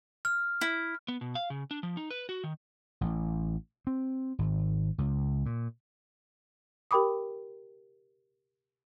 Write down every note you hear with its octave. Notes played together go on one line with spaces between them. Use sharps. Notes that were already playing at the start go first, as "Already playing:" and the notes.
F6
E4
B3
B2
F5
C#3
D4
F3
D#4
B4
F#4
D#3
A1
C4
G#1
C#2
A#2
G4 A#4 G5 B5 D6 D#6